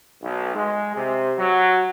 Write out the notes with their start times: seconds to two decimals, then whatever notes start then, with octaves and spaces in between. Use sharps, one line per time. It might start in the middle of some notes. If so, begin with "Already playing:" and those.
0.22 B1
0.56 G#3
0.95 C3
1.37 F#3